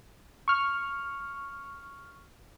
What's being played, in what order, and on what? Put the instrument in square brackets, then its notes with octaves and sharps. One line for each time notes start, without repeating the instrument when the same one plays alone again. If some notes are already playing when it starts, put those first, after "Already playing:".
[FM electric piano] C#6 F6